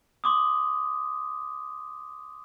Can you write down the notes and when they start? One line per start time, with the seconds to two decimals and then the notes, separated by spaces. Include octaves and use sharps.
0.24 C6 D6 D#6